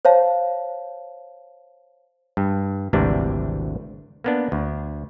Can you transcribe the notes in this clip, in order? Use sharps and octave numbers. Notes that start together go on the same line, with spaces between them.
C5 C#5 F5 A5
G2
G#1 D2 C3 E3 G3 D4
A#3 B3 D4
D2